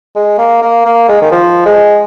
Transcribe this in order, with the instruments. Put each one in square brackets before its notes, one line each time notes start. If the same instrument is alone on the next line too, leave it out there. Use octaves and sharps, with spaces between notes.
[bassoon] G#3
A#3
A#3
A#3
G#3
D#3
F3
G#3